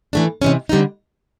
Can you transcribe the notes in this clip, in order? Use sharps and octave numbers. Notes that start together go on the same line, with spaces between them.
E3 A3 D4
C3 E3 G#3 C#4
D3 G3 C4 D#4